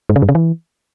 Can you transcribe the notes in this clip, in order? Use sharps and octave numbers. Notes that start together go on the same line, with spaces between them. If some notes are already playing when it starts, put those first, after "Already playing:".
G#2
C#3
G2
C#3
E3